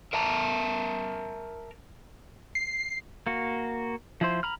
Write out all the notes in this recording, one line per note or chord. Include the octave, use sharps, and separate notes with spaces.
A#4 E5 A5 A#5
C7
A#3 F#4
F3 E4 C5
A#5 B5 F6